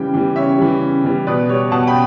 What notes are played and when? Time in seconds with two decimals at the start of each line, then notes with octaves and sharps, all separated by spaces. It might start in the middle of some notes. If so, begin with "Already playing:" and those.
Already playing: C#3 E3 G3 G5
0.14 E3 G3
0.36 C#3 C#5 E5
0.58 E3 G3
0.82 C#3
1.05 E3 G3
1.27 B2 B4 D5
1.49 G3 C#5
1.71 B2 F#5 A5
1.87 G5 B5